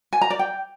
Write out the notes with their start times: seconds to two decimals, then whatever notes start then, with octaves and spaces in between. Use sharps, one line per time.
0.13 G#5
0.21 A#5
0.30 D5
0.39 G5